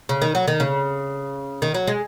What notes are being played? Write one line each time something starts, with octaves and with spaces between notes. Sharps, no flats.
C#3
D#3
F#3
D#3
C#3
D#3
F#3
G#3